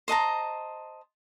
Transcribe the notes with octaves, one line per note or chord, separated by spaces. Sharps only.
C5 D#5 A5 A#5